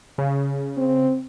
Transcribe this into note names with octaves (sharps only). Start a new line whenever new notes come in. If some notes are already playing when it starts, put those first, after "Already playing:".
C#3
C4